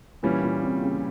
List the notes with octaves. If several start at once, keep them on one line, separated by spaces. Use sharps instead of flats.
A#2 E3 G3 C#4
A#2
C3
C#3